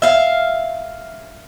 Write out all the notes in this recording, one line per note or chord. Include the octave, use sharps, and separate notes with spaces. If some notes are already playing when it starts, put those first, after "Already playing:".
E5 F5